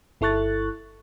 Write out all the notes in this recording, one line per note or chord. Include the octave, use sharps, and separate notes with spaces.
G1 E4 A4 C#6 F#6 A6